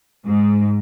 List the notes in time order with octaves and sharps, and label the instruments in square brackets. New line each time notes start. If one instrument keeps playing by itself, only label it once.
[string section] G#2